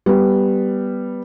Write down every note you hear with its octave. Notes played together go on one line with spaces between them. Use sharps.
G3 B3